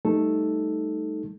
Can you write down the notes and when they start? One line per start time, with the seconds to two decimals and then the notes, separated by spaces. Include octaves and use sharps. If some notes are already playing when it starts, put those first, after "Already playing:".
0.05 G3 A3 D#4 A4